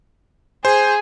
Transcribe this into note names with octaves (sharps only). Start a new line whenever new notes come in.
G#4 C5